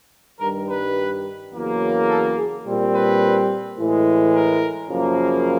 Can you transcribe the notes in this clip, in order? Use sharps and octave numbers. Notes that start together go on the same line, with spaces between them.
G2 D#3 G3 A#4
B4
E2 C#3 F#3 A#3
A4
G#4
A#2 G3 C4
B4
A2 E3 G#3
A#4
F#2 C#3 F3 A#3